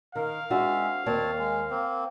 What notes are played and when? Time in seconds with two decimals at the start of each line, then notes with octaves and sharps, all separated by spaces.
0.16 D#3 A#4 F5
0.50 G#3 C4 D4 F#4 E5
1.06 D#2 A#3 C4 C#5 D5 A5
1.39 G#3
1.71 A#3 C4